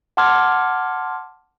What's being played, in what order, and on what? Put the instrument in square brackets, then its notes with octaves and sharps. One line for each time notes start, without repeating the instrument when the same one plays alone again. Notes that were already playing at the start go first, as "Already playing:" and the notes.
[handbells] F#5 A5 C6 D6 F6 G#6